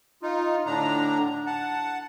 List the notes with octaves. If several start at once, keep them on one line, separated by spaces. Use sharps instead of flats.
D#4 F4
A2 D3 D4 A#5
F#5 A5